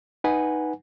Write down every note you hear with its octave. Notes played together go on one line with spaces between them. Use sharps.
D#4 B4 F#5 G#5